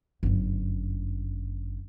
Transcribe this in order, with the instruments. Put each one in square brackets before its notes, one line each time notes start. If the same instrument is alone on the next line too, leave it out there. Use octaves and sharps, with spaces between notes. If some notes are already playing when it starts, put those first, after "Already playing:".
[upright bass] G1 F#2